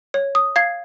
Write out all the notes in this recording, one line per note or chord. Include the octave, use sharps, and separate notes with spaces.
C#5
D#6
F5 G#6 C7